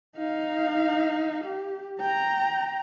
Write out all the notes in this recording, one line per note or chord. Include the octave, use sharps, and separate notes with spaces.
D#4 F5
G4
G5 A#5